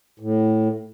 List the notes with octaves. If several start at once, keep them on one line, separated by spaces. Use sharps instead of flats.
A2